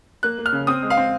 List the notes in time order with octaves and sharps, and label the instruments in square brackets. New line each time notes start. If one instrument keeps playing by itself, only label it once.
[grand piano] A#3 F#6
A#3
F6
C#3
C4 D#6
G#3
F5
C4